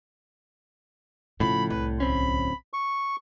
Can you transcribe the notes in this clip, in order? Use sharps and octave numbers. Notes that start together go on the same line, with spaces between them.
A2 C#3 F3 B5
C2 B4
D1 C4 C#4 B5
C#6